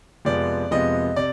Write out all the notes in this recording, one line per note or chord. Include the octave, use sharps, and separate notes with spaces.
F2 C3 F3 G#3 B3 D5
F2 C3 F3 G#3 B3 D#5
C3 D5